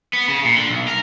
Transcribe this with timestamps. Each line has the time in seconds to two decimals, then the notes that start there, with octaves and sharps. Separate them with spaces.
0.13 B3
0.28 C#3
0.44 A#2
0.56 D3
0.70 B1
0.88 A#4